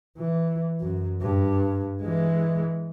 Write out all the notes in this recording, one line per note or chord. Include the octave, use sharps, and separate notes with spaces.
E3
F#2
G2
E3 G#3